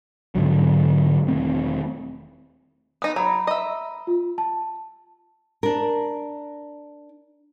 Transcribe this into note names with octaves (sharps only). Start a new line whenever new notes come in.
G#2 D3 F#3
E1 D#3 A3 C4
B3 D#4 D#6
F#3 A#5 B5
D#5 E5
F4
A5
D4 A#4